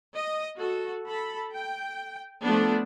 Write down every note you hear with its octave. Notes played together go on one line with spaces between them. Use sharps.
D#5
F#4 A4
A4 B5
G5
F3 A3 B3 D4